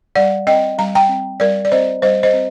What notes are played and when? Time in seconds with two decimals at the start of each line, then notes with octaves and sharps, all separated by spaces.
0.15 G3 D5 F#5
0.47 C4 D#5 G5
0.78 G3 A#5
0.95 G5 A#5
1.09 C4
1.40 G3 A#4 D5
1.65 D5
1.72 C4 C5 D#5
2.02 G3 C5 D#5
2.23 C5 D#5
2.34 C4